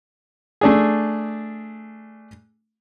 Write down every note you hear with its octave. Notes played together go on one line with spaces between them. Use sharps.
A3 D4 G#4